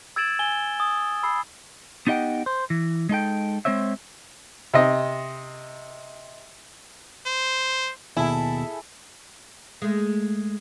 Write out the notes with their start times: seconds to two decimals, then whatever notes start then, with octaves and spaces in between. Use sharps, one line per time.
0.16 E6 G#6 A6 D7 E7 F#7
0.39 G#5 G7
0.80 D#6
1.23 B5 E6 C7
2.07 B3 D#4 G4 D#5 F#5 G5
2.46 C5
2.70 E3
3.09 G#3 D#4 A4 G5
3.65 G#3 C4 C5 C#5 E5
4.74 C3 D#5
7.26 C5
8.17 D#2 B2 E4 G#4 A4
9.82 G#3 A3